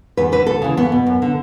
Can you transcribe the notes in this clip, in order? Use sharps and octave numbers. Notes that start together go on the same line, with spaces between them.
E2 B4
D3 B4
D2 A4
C#3 E3
E2 B3
B2
F#2
D3